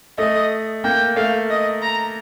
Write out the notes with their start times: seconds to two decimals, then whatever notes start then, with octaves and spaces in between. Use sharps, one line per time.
0.18 A3 D#5
0.84 A#3 G5
1.16 A3 F5
1.50 D#5
1.82 A#5